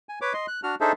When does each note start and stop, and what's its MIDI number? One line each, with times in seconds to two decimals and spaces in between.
0.09 0.19 80
0.21 0.33 71
0.21 0.33 73
0.21 0.33 86
0.33 0.46 75
0.33 0.46 84
0.48 0.60 90
0.63 0.75 62
0.63 0.75 66
0.63 0.75 89
0.81 0.92 62
0.81 0.92 63
0.81 0.92 68
0.81 0.92 69
0.81 0.92 72
0.81 0.92 76